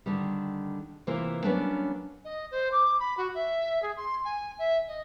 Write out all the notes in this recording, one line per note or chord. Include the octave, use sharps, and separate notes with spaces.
D3 D#3 G3
C3 E3 A#3 F4
F#3 G3 A#3 B3 C#4 D4
D#5
C5
D6
B5
F#4
E5
G#4
C6
G#5
E5
D#5